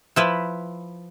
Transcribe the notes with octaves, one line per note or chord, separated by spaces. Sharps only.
F3 E4 B4